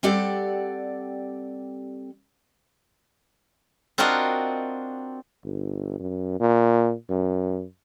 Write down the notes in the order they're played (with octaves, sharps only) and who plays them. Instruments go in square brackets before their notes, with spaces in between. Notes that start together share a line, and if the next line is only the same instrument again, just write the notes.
[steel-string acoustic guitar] G3 C4 G4 A4 D5 F#5
[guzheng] C4 D4 F4 F#4 A#4 D#5
[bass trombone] G1
F#2
A#2
F#2